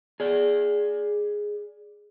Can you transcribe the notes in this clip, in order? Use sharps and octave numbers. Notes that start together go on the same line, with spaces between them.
G#4 D5